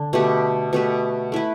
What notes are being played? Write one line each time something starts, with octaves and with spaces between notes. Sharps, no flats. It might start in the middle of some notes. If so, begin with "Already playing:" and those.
Already playing: D3 D4
B2 A3 G4 B4
B2 A3 G4 B4
A3 E4 B4